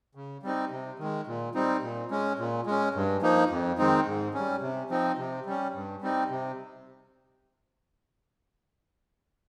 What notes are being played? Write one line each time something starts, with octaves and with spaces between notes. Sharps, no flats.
C#3
G3 C4 D#4
C3
D#3 G#3
A#2
G3 C4 D#4
A#2
G#3 C#4
A#2
G#3 C#4
G2
F3 A#3 D#4
F2
D#3 G#3 C4 D#4
G#2
G3 C#4
C3
F3 C4 D#4
C3
G3 C#4
G2
G3 C4 D#4
C3